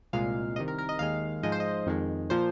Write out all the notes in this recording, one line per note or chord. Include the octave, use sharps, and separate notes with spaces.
C2 A#2 G#3 F5
C2 C3 D#3 D#5
A#4
A#4
D#5
D#2 D#3 G#3 F5
G#2 F3 G#3 D#5
C5
D#5
F2 D#3 G#3
A#2 F3 C5